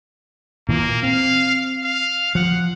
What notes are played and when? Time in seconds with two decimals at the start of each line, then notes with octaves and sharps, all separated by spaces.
0.69 A#2 E3 A#3
1.03 C4 F5
1.84 F5
2.35 F3 F#5